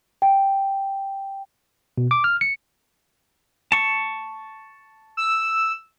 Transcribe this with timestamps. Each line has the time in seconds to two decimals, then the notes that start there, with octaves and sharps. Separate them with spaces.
0.22 G5
1.98 B2
2.11 D6
2.24 F6
2.41 C#7
3.72 A5 C#6
5.17 E6